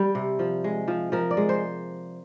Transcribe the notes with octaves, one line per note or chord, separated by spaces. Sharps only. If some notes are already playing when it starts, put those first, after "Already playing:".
Already playing: G3
C3
F3
G#3
F3
F3 A#4
D5
G#3
C5